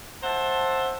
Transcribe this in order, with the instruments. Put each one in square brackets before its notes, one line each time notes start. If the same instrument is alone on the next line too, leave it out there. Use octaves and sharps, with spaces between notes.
[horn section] C5 E5 F#5 A5